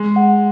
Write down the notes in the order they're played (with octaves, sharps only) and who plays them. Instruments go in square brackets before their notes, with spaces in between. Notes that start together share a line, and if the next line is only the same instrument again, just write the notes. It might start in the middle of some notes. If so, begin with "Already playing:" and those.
Already playing: [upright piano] G#3 [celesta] G#4
[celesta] F#5